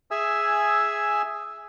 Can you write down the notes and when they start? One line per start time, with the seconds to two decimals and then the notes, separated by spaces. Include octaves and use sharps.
0.11 G#4 E5 G#5 E6